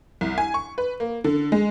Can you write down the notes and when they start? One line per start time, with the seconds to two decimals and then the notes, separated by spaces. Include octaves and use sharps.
0.21 C2
0.38 G#5
0.54 C#6
0.78 B4
1.00 A#3
1.24 D3
1.52 G#3